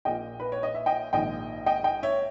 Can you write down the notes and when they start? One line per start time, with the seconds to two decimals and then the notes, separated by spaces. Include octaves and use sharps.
0.05 A#1 A#2 D#5 G5
0.40 B4
0.52 C#5
0.63 D#5
0.74 E5
0.86 D#5 G5
1.13 A#1 G#2 D#3 D#5 G5
1.66 D#5 G5
1.84 D#5 G5
2.03 C#5 E5